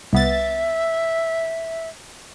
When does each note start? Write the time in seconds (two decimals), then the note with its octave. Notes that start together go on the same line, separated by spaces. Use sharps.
0.13 C2 B3 E5 A6